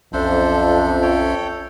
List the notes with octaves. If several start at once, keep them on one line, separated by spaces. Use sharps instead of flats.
B1 F2 C#4 D4 A4 C5 E5
A4 C#5 G5